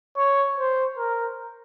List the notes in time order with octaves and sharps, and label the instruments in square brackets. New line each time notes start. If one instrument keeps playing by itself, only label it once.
[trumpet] C#5
C5
A#4